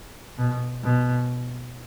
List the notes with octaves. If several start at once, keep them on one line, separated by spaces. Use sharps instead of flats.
B2
B2